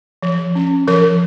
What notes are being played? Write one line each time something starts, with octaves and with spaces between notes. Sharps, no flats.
F3
C#4
F3 A#4